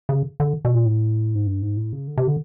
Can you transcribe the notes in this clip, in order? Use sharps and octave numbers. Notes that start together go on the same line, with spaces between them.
C#3
D3
B2
A#2
A2
G#2
G2
G#2
A2
C#3
D3
C3
D3